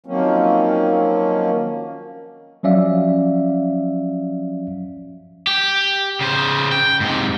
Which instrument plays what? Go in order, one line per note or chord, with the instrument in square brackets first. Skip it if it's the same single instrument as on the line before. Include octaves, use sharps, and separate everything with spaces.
[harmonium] D#3 F3 F#3 A#3 C4 C#4
[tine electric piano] F3 F#3 C#4 D5 E5 F5
[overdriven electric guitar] G4
C#3 C5
G5
G#2 C3